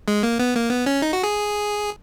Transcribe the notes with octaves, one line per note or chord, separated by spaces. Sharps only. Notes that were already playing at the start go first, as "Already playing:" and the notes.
G#3
A#3
B3
A#3
B3
C#4
D#4
F#4
G#4